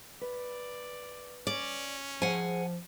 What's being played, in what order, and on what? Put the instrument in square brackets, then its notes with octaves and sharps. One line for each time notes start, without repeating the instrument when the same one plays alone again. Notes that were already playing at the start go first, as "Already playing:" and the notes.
[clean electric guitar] B4 [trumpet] D5
[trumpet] C#4 [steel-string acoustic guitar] D5
[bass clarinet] F3 [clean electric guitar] G#4 C5 [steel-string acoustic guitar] F#5 G#5